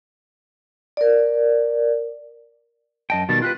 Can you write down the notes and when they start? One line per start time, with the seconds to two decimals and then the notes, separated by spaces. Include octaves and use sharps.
0.97 A#4 D5
3.10 F#2 D#5 G5 A5
3.29 B2 D#3 G3 A6
3.42 F4 G4 B4 F#6